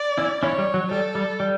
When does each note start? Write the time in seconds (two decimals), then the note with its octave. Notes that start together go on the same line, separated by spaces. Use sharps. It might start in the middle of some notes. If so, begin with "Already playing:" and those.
Already playing: D5
0.18 C#4 E4
0.42 C#4 E4 C#5
0.58 G3
0.74 F#3
0.91 G3 A4
1.15 G3
1.40 G3